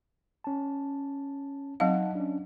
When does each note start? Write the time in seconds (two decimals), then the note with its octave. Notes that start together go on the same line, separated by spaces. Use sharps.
0.44 C#4 A5
1.80 F#3 C4 D#4 F5 F#5 A5
2.15 C#4 D4